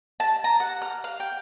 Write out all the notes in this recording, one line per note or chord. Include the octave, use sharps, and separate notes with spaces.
A5
A#5
F#5
F6
F5
G5